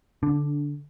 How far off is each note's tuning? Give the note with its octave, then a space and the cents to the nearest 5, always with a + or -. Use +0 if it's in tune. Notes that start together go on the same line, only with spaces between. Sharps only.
D3 -15 D4 +0